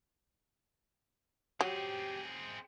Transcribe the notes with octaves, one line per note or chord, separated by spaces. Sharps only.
F#3 C4 G4 G#4